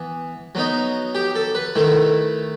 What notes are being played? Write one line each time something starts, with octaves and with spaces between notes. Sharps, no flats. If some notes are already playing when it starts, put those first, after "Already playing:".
Already playing: E3 B3
F#3 B3 D#4
G4
A4
B4
D#3 A3 E4